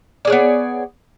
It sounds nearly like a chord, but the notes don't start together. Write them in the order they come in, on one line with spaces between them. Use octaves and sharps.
D5 G#4 C#5 B3